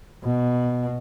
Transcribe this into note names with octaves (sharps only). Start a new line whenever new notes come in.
B2